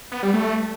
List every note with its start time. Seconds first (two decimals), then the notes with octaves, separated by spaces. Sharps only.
0.12 B3
0.23 G3
0.34 A3